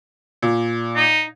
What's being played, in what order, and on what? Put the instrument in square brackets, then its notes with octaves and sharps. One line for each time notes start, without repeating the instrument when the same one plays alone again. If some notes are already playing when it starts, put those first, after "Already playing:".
[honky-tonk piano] A#2
[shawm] D#4